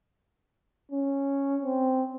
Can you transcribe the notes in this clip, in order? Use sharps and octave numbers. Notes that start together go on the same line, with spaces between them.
C#4
C4